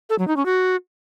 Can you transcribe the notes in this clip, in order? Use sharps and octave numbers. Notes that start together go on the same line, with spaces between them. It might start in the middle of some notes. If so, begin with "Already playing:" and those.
A4
F#3
D#4
C#4
F#4